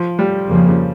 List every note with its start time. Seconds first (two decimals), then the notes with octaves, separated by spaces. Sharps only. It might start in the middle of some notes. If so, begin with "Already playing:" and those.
Already playing: F3
0.19 G3
0.47 F2 C#3 F3 A#3